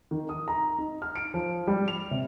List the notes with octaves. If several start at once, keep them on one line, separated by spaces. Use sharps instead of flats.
D#3
D#6
A#5
D#4
F6
D7
F3
G3
F7
C3